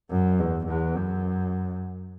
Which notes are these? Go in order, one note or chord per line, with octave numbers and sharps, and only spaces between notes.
F#2
E2
E2
F#2